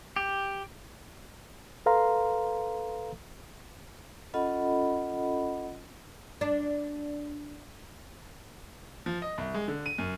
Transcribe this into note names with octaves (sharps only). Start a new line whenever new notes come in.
G4
A4 B4 F5 A#5 C6
C#4 F4 A4 D#5 F#5 B5
D4
F3
D#5
C2
G#3
D3
D#7
F#2